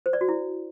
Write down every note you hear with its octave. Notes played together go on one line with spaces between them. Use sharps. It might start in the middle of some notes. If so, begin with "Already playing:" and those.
C5
D5
F#4
E4